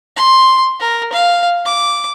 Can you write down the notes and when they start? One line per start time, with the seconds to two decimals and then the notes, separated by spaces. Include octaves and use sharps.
0.17 C6
0.80 A#4
1.13 F5
1.65 D6